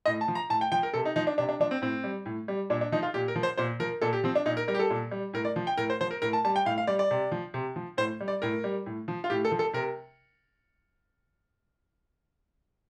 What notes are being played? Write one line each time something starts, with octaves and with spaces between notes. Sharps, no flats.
A2 D#5
A5
F3
A#5
A2 A5
G5
F3 G5
A#4
C3 A4
D#4
F3 D#4
D4
C3 D4
D4
F3 D4
C4
A2 C4
G3
A2
G3
A#2 D4
D4
F3 D#4
F4
A#2 G4
A#4
F3
C5
A#2 C5
F3 A#4
A#2 A4
G4
F3 C4
D4
A#2 D#4
A#4
G3 A#4
G4
A4
A#2
G3
A2 A#4
D5
F3
G5
A2 A#4
C5
F3 C5
A#4
A2 A#4
A5
G3 A5
G5
A2 F5
F5
G3 D5
D5
C3
F3
C3
F3
A2 C5
G3
D5
A2 A#4
G3
A2
F3
F4
A2 G4
A4
F3
A4
C3 A#4